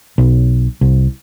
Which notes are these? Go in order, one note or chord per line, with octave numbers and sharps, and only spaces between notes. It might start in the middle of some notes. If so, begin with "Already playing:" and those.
B1
C2